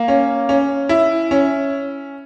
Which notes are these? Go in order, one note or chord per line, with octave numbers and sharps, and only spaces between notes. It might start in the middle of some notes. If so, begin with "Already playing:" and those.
Already playing: A#3
C#4
C#4
E4
C#4